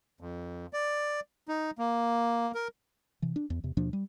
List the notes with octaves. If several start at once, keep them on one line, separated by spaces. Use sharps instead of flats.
F2
D5
D#4
A#3
A#4
C3 E3
D4
E2
E2 C3
D#2 B2 F3 D4
G3